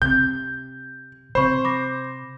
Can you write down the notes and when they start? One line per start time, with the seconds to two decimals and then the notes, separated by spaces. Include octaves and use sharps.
0.02 C3 G6
1.35 C3 C5 B5 C#6
1.64 B5 D6 A#6